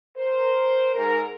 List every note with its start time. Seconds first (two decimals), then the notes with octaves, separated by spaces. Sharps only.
0.16 A#4 C5
0.94 G#2 A#4